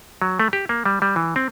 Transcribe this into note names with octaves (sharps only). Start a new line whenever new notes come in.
F#3
A3
G4
A#3
G3
G3
E3
C4